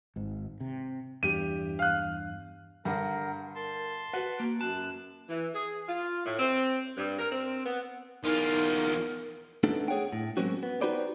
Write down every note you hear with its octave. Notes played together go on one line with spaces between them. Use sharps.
G#1 G#2
C3
E2 G2 G4 D#7
F5 F#6
G2 D3 A#4 F#5
A#4 A5 C6
F#4 B4 F#5
A#3
F#2 A5 F#6
E3
G#4
F4
A2
C4
G2
A#4
C4
B3
E2 D#4 F4 A#4
A3 B3 D4 D#4 A4
G#4 C#5 F#5 G5
A2
F#3 G#3 A#3 C4 C#4 F#4
B3
D#4 F#4 G4 B4 C5 D5